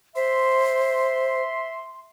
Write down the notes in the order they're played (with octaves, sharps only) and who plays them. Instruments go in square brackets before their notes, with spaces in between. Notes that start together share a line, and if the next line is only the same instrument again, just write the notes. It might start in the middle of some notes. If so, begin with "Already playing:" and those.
[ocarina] C5 [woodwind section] E5 C6